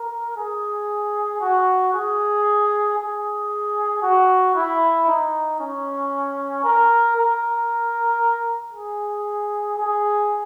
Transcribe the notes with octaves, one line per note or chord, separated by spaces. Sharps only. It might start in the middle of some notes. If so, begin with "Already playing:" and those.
Already playing: A#4
G#4
F#4
G#4
G#4
F#4
E4
D#4
C#4
A#4
A#4
G#4
G#4